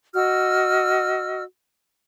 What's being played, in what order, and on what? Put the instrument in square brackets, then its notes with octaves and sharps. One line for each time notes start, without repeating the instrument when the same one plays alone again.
[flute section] F#4 D#5 E6 F6